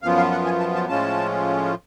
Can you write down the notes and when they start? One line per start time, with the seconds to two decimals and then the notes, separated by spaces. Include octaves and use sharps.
0.02 F#2 F3 B3 F4 F5
0.17 F5
0.32 F#5
0.45 G#5
0.60 A5
0.75 A5
0.88 A2 F3 G#3 C#4 F4 A5